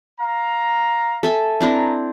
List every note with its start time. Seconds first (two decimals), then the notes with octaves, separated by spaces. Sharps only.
0.20 F5 A#5
1.23 A4 E5 G#5
1.60 C4 D4 E4 B4 A#5